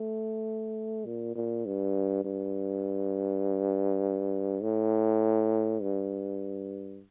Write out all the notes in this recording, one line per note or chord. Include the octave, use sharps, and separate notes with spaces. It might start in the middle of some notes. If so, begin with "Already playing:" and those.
Already playing: A3
A#2
A#2
G2
G2
A2
G2